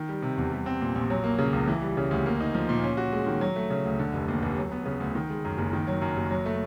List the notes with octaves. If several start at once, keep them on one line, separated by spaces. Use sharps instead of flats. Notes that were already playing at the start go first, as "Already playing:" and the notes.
Already playing: D#3
G3
C3
E2
G3
C4
A#2
A#1
F#3
A#3
C#3
C#2
E3
G3
C#3
D2
A#3
D#4
F3
A#2
C#4
F#4
G#3
D#3
F#3
A3
C#3
D2
D3
F1
D#2
F1
F#3
B3
C#3
D2
D#3
G#3
F#2
F#1
D#3
F#3
F#2
F#1
F#3
A3